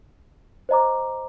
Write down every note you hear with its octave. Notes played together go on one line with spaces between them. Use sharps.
C5 D#5 A#5 D6